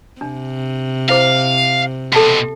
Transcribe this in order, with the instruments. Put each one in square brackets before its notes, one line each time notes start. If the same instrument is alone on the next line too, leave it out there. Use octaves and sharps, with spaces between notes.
[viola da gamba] C3 [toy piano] D4
[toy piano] E4 C5 D6 [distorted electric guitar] F5
[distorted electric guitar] B2 C4 [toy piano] A4 A5 C6